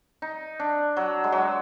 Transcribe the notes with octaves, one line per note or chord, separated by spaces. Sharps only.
D#4
D4
F#3
G#3
F#3